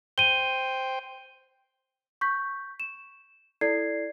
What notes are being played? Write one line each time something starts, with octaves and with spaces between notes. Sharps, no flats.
C5 G5 D#7 G7
C#6 G6 B6
E7
E4 A4 D5 G#6 C7